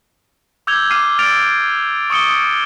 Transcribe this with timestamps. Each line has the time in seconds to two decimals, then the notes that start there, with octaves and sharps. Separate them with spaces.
0.67 D6 E6 G6 G#6 F7 G7
0.90 D6 F6 C7 D#7
1.19 E6 F6 A6 D7 F7
2.10 C#6 D#6 C#7 G7